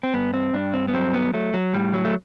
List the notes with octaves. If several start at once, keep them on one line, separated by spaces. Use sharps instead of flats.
C4
G2 B3
C4
G2 D4
C4
B3
F#3 C4
B3
F#3 A3
F#3
A2 G3
F#3
A3